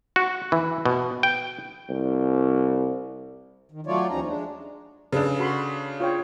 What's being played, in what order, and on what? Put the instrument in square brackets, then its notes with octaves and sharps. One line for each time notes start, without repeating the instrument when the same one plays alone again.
[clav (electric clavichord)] F#4
E3
B2
G5
[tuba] C2
[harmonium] D#3
F#3 A3 F4 C#5 D5
D#2 F3 G3 C#4 D#4 A#5
G#3 D4
[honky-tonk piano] C#3 D4 [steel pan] G#4 A4 B4
[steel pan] F#4 B5 C6
F4 C#5 G5